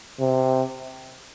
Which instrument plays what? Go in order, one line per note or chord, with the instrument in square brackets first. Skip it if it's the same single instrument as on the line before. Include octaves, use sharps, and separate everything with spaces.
[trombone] C3